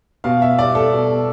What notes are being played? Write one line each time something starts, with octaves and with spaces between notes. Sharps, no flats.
B2 F5
E5
G3 D5
A4
B2